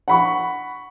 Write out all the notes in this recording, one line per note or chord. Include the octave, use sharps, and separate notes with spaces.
F#5 B5 C#6